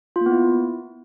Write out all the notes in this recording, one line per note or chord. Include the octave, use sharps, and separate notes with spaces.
F4
A#3
B3
E4